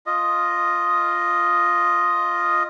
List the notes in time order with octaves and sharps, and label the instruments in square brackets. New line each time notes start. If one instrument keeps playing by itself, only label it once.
[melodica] F4 D#5